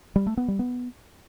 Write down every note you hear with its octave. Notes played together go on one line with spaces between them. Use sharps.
G3
A3
B3
G3
B3